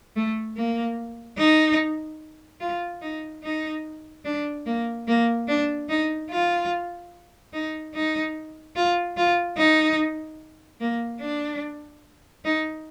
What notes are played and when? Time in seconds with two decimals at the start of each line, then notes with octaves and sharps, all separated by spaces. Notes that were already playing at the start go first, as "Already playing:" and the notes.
0.16 A3
0.57 A#3
1.38 D#4
2.61 F4
3.02 D#4
3.43 D#4
4.25 D4
4.66 A#3
5.08 A#3
5.48 D4
5.89 D#4
6.30 F4
7.53 D#4
7.94 D#4
8.76 F4
9.17 F4
9.58 D#4
10.80 A#3
11.21 D4
12.45 D#4